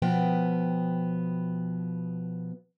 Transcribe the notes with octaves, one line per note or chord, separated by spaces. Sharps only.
B2 F3 B3 G5